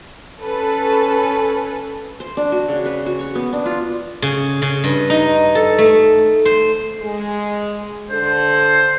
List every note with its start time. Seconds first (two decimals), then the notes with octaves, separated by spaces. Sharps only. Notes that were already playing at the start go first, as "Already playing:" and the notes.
0.42 C#4 A4 B4
2.20 C5
2.37 D4
2.52 F#4
2.68 C#3
2.86 B4
3.06 F#4
3.19 C#5
3.35 B3
3.53 D4
3.66 F4
4.22 C#3
4.62 C#3
4.84 G2
5.10 D#4
5.55 A4
5.78 A3
6.45 C5
7.02 G#3
8.11 D3 A4 C5